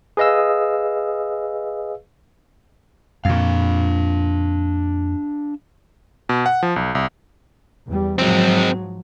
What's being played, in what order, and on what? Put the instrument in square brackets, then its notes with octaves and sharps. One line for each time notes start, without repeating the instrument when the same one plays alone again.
[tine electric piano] G#4 B4 D#5 F5 E6
[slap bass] F2 A#2 [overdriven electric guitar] D4 F5
[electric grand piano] B2
F#5
F3
B1
C2
[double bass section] E2 G3
[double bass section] G#2 F3 F#3 [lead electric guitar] G#3 C4